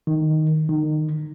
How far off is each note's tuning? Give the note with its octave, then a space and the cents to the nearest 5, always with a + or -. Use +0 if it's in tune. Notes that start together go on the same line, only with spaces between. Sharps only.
D#3 +0
D#3 -20